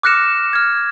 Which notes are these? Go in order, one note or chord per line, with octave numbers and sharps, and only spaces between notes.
D6 F6 F#6 A#6 C#7 E7
F6 G#6